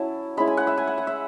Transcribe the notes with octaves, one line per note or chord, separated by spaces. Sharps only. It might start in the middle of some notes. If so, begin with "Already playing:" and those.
Already playing: F#3 C#4 E4 A5
G#3 C#4 E4 B5
G#5
F#5
E5
G#5
F#5
F#5
E5